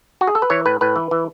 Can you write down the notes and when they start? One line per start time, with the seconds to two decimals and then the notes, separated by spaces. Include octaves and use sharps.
0.21 F#4
0.27 G#4
0.35 A4
0.42 B4
0.50 E3 C#5
0.66 A2 B4
0.81 A2 B4
0.96 E3
1.11 E3